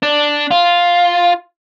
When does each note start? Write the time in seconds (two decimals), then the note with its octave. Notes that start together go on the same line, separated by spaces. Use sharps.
0.03 D4
0.51 F4